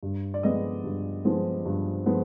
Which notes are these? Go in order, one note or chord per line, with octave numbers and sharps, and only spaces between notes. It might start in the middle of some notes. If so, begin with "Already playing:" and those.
G2
D5
F3 G#3 B3 D#5
G2
F3 G#3 B3
G2
F3 G#3 B3